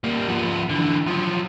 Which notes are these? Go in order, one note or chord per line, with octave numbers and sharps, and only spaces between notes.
G3 A#3
F3 B3
D3 E3
F3 F#3